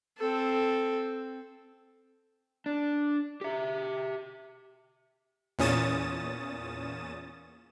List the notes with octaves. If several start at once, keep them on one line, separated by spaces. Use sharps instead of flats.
C4 A4
D4
G4 E5
E2 A#2 C#4 D#6 A6 E7